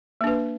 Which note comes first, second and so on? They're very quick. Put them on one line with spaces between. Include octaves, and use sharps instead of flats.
A#3 D4 B4